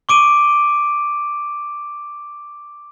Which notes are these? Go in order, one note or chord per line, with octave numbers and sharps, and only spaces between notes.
C#6 D6 D7 D#7